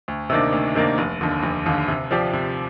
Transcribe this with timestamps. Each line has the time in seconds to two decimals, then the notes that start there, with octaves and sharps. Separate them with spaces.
0.08 D2
0.30 C3 D#3 A#3 D4
0.52 D2
0.75 C3 D#3 A#3 D4
0.98 F1
1.21 D#2 D3
1.43 F1
1.66 D#2 D3
1.88 C3
2.11 F3 C4 G4 D5
2.33 C3